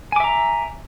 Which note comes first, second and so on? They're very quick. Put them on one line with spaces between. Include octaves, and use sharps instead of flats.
G#5 D6 E5 A#5